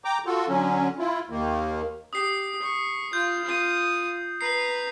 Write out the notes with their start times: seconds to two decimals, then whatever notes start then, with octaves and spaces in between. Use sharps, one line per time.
0.05 G5 A#5 D6
0.26 F4 F#4 A4
0.48 D3 F#3 C#4
0.99 E4 F4
1.30 D#2 D#3 A#3
2.13 G4 D#6 C7
2.62 C#6
3.13 F4 G6
3.44 F4 D#6
4.41 B4 A#5 C7